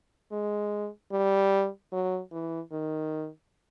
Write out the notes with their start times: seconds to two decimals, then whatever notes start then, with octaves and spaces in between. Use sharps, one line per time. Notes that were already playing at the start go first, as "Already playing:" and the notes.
0.32 G#3
1.12 G3
1.93 F#3
2.32 E3
2.72 D#3